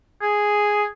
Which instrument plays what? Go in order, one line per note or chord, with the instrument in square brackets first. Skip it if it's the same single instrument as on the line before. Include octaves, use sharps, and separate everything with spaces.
[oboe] G#4